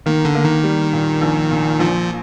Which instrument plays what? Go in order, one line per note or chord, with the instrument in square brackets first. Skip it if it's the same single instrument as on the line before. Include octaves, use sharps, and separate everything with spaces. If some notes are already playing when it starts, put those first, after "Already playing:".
[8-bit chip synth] D#3 [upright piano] A#3
[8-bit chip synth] D3
[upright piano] A#3
[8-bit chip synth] D#3
[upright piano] G3
A#2
A#1
A#2
[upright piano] A#1 [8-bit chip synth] F3